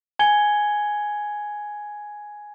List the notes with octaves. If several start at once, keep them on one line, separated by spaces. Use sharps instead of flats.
G#5 G#6 C#7 G7